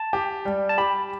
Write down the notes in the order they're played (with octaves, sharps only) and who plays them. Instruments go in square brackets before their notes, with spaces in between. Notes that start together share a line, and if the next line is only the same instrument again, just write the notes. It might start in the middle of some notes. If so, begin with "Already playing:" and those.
Already playing: [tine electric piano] A5
[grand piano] G4
G3
[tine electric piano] A5
[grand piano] G4 [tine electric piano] B5